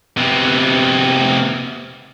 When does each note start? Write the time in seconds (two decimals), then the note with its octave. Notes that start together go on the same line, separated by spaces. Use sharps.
0.17 C3 B3